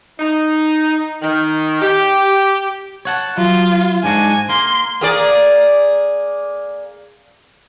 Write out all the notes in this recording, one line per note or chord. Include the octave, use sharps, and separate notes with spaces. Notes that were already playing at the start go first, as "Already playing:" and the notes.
D#4
D#3
G4
C#5 F#5 A5
F#3 F4
G#2 D4 F#4 G#5
A#3 C6
A#3 G#4 D5